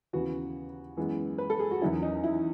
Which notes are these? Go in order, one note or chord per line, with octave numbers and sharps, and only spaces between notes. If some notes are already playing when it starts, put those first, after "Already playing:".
D#2 C#3 E3 B3 F#4
F#2 E3 G#3 B3
B4
A4
G#4
F#4
E2 D#3 F#3 C#4 E4
D#4
E4